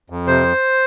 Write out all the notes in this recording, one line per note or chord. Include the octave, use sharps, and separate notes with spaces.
F2
C3 C5